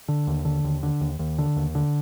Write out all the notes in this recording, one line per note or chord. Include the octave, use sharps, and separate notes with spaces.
D3
D#2
D3
D#2
D3
D#2
D#2
D3
D#2
D3